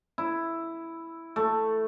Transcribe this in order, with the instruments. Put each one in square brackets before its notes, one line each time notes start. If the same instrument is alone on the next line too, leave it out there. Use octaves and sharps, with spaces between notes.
[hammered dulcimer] E4
A3